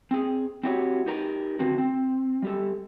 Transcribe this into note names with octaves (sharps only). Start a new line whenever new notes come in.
C4 G#4
C4 E4 F#4 G4 B4 C#5
D#4 G4 A#4 B4 A#5
D3 D#3 C4 F#4
C4
G3 G4 A4